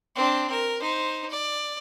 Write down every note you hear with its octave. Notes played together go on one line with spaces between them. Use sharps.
C4 D4
A#4
D#4 C5
D5